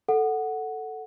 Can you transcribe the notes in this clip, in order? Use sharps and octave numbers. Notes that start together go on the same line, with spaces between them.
A4 F#5